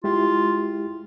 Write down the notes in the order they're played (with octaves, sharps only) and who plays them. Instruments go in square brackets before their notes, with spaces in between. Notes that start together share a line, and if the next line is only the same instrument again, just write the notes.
[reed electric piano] G#3 E4 G4 [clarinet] F4